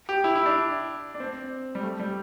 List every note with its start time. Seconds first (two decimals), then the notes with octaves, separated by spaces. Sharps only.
0.09 G4
0.24 E4
0.36 E4
0.46 D4
1.14 D4
1.20 C4
1.75 G3
1.83 A3
1.99 G3